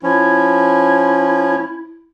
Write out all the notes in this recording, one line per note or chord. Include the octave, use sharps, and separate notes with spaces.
F3 C#4 E4